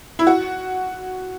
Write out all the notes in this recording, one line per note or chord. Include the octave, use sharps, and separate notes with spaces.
E4
F#4